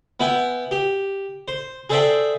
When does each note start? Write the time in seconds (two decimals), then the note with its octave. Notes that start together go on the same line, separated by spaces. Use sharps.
0.20 B3 E4 G5 G#5
0.71 G4
1.48 C5
1.90 G#4 A4 C5 D5 E5 G5